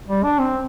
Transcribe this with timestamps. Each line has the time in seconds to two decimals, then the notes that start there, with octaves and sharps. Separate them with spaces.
0.08 G3
0.24 D4
0.39 C4